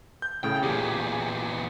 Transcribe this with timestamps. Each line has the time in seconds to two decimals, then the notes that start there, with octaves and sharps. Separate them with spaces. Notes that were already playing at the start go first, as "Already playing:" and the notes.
0.22 G6
0.44 A2 C#3 G5
0.63 E2 A#2 G4 G#4